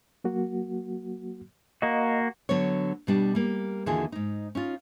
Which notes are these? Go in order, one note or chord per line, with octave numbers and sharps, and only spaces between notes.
F#3 A#3 F#4
A#3 F#4 D#5
D3 F#3 B3 C#5
B2 G3 D4
G3 A#3
D#2 D3 E3 F4 F#4 G#4
G#2 D#4
C#4 D#4 F4